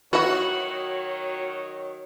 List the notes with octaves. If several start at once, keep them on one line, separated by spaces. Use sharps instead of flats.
D#3 F#3 B3 E4 F#4 C#5